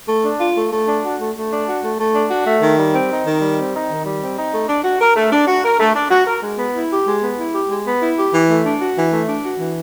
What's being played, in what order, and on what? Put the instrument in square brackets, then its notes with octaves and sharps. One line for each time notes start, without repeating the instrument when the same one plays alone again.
[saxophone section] A3
D4
F4
A3
A3
D4
F#4
A3
A3
D4
F#4
A3
A3
D4
F#4
A3
D#3
G3
C4
D#4
D#3
G3
C4
D#4
D#3
G3
C4
D#4
A3
D4
F#4
A#4
A3
D4
F#4
A#4
A3
D4
F#4
A#4
G#3
B3
E4
G4
G#3
B3
E4
G4
G#3
B3
E4
G4
E3
A3
D4
F#4
E3
A3
D4
F#4
E3